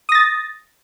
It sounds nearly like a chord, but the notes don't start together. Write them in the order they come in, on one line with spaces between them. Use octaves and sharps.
D#6 A#6 A6